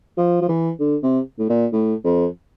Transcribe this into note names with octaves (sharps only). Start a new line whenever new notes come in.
F3
F3
E3
D3
C3
A2
A#2
A2
F2